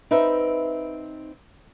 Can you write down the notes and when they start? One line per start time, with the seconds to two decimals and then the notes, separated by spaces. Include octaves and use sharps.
0.11 C4 D#4 B4 E5